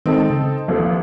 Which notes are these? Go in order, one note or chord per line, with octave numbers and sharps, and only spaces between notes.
D#3 G#3 C4 D#4 A4
C#3
A1 D#2 F3 A4